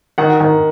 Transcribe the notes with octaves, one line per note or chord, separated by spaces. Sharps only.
D#3 F#5
D#3